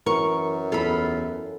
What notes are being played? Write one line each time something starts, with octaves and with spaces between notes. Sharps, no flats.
F#2 E3 A#4 C#6
E2 F4 A4 B5